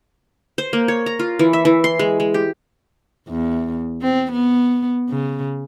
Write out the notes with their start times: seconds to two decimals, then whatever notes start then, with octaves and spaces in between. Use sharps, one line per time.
0.58 C5
0.73 A#3
0.88 C#5
1.06 A#5
1.19 F4
1.39 E3
1.53 E5
1.65 E3
1.84 C6
1.99 G#3
2.20 G#3
2.34 G4
3.29 E2
4.02 C4
4.32 B3
5.10 C#3